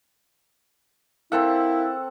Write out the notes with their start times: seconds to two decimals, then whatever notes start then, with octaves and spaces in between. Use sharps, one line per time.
1.32 C4 E4 A4 A#4 F5 F#5